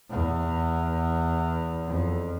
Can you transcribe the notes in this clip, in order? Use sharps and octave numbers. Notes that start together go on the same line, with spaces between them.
E2
F2